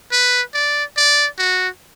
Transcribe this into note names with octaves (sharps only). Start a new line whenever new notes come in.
B4
D5
D5
F#4